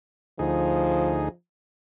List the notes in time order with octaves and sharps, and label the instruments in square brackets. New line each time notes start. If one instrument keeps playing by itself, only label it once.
[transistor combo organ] D2 D#4 G#4 [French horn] F3